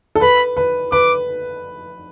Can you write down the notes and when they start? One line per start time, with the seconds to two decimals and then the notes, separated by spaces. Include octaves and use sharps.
0.15 A4
0.21 B4 B5
0.57 B4
0.92 B4 D6